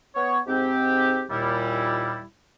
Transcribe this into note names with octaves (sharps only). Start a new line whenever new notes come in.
B3 C#5
G#2 C4 G4
D#2 A#2 G3 E4